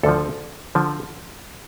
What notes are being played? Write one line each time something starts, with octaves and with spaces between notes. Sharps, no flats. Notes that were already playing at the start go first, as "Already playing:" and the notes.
D2 D3 F3 A4
D3 F3